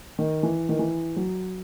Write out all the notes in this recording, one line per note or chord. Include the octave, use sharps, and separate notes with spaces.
D#3
E3
D#3
E3
F#3